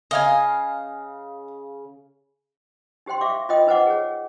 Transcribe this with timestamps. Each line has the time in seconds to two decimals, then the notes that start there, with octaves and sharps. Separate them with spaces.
0.11 C#3 D#5 F5 G#5
3.06 D#4 G4 C5 G5 C6
3.21 G4 E5 F5 D6
3.34 E5
3.49 F4 C5 D#5 G5 D#6
3.67 D#4 B4 C5 D#5 F#5 D6
3.87 G#4 C#5